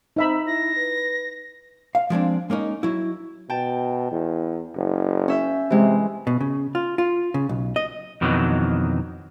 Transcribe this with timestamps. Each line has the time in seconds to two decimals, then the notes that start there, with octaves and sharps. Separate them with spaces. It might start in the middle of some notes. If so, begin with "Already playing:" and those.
0.16 C4 D#4 E5 B5
0.47 E4 A#6
0.77 B4
1.95 F5
2.10 F3 G#3 C4 D4
2.50 G#3 A#3 C#4 D#4
2.83 F#3 E4
3.50 B2 G5 A5
4.11 E2
4.76 F#1
5.28 C#4 E5 G6
5.70 C3 E3 G#3
6.27 B2
6.41 C#3
6.75 F4
6.98 F4
7.34 C#3
7.49 B1
7.76 D#5
8.21 F2 B2 D#3 E3 F#3